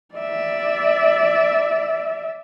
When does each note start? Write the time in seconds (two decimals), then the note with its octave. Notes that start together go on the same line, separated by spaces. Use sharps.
0.15 D5 E5